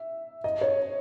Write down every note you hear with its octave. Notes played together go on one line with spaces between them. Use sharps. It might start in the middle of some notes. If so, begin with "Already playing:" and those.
Already playing: E5
D#5
C#5